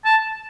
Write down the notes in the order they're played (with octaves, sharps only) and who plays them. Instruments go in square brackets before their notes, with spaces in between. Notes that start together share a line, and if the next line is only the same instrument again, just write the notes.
[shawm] A5